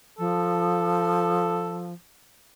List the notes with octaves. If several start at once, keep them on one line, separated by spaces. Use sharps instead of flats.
F3 A4